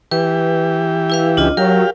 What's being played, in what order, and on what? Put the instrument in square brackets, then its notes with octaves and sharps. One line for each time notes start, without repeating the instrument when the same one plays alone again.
[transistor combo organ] E3 G4 [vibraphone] B4
[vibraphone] E4 B4 F5
[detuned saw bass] C#2 [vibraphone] D4 F4 D#5
[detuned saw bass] F#3 [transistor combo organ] G4 F5 [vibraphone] A#4